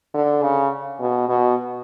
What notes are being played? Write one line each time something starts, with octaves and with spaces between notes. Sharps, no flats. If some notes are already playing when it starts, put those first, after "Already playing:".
D3
C#3
B2
B2